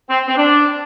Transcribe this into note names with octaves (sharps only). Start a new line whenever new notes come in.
C4
C4
D4